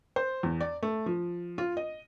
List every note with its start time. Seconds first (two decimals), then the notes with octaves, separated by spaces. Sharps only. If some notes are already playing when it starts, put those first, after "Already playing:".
0.16 C5
0.43 E2
0.61 D5
0.83 A3
1.06 F3
1.58 F4
1.77 D#5